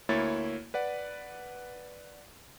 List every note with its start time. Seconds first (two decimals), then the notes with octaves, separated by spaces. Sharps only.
0.09 D2 A#3 E4 C#5 A6
0.74 B4 D5 F#5